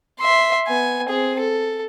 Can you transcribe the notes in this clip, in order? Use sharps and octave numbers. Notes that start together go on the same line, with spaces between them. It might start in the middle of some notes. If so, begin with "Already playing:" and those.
E5 C6
B3 G#5
C4 G#4
A4